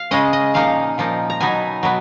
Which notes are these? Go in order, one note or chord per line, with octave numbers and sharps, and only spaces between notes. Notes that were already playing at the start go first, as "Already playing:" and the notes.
Already playing: F5
C#3 G#3 C#4 D#5
D#5
A#2 F3 A#3 D#4 F5
A#2 F3 A#3 D#4
A#5
B2 F#3 B3 D#4 G#5
B2 F#3 B3